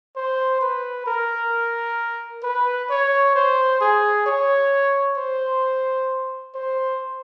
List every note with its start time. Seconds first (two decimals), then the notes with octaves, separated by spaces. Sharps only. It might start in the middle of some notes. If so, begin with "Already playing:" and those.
0.16 C5
0.61 B4
1.07 A#4
2.43 B4
2.90 C#5
3.35 C5
3.81 G#4
4.26 C#5
5.17 C5
6.55 C5